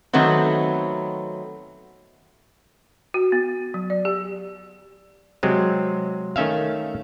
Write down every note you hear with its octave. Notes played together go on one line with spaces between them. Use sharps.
D#3 F#3 A3 B3 C4
F#4
B3
F#3
D5
G4
C3 F#3 G#3 C4
D#3 A3 C#4 E5 F5